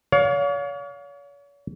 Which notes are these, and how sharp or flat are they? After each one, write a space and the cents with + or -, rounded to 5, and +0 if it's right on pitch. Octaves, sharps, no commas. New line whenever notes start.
C#5 +40 F5 +25